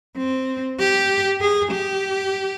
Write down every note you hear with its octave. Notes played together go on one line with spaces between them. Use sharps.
C4
G4
G#4
G4